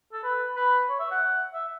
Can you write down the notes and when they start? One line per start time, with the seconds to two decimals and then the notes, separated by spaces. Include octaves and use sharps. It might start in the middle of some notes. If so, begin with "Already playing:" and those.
0.13 A4
0.24 B4
0.56 B4
0.90 C#5
1.00 E5
1.11 F#5
1.54 E5